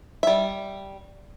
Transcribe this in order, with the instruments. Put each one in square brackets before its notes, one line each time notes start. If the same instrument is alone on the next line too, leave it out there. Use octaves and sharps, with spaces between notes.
[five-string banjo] G3 E5